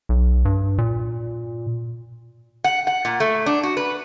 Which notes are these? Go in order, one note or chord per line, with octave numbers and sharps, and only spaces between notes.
B1
G2
A#2
F#5
F#5
A#2
A3
D4
F#4
B4